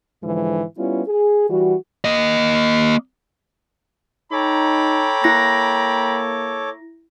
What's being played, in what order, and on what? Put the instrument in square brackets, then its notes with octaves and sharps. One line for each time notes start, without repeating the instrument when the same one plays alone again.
[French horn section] G#2 D3 E3 F3 G#3
G3 B3 C#4 E4 F4
G#4
E3 G3 F#4
[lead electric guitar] A#3 D#5
[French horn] D#4 [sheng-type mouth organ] A4 C#5 D6 [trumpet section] G5 A#5 B5
[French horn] A#3 [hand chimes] E4 A#6